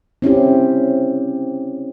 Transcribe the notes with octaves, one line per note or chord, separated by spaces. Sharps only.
C4 C#4 E4 G4